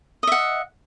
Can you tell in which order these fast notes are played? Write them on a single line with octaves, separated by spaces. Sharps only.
D#5 E5 F#5